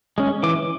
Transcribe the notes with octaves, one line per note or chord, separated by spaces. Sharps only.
G#3 C#4
E3 D6